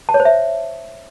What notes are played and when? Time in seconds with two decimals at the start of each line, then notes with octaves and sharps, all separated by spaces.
0.09 A5
0.14 C#5
0.20 C5
0.25 E5